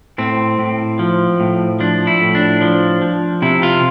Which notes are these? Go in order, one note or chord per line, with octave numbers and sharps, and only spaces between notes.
A2 C4
A2
F3
A2
F3 D4
E4
A2
D4
F3
F3
C3 E4
F4